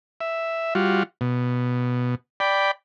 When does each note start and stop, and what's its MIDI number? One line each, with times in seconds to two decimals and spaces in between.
0.21 0.74 76
0.75 1.03 55
0.75 1.03 65
0.75 1.03 66
1.21 2.15 47
2.40 2.71 74
2.40 2.71 79
2.40 2.71 83